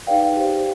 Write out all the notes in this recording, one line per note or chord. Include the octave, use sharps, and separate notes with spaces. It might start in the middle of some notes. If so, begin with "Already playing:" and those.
D#4 G#4 B4 D5 F5 G5
G4 C5